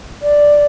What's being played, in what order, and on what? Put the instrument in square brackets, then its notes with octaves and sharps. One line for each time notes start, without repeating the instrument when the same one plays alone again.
[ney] D5